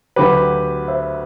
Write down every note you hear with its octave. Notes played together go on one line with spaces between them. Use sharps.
D2 D3 F#3 G4 B4
C5 E5